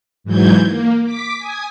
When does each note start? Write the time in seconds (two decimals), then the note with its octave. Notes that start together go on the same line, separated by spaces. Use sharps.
0.24 G#2 E3 F#3 G6 G#6
0.65 A#3
1.04 D6 B6
1.38 G#5 D#6